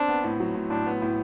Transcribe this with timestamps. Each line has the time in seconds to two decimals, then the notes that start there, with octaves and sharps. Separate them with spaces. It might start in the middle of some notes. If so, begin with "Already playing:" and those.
Already playing: C4 D4
0.08 B3
0.24 A2
0.40 F#3
0.55 A2
0.70 A2 D4
0.86 B3
1.02 A2